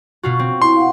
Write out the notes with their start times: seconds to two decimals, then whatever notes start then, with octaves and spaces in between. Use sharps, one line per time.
0.23 B2 F4 F#4
0.39 C4
0.62 E4 C6
0.76 F5 F#5